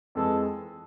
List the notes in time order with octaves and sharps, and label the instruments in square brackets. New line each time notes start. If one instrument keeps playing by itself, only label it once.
[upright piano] F2 E3 G#3 [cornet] A4